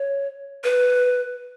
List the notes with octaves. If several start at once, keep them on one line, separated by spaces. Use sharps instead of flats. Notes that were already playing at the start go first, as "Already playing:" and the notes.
Already playing: C#5
B4